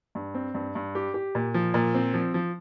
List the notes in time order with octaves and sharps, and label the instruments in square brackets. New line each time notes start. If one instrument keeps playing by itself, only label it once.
[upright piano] G2
C4
G2
G2
G4
G4
A#2
F3
A#2
C4
F3
F3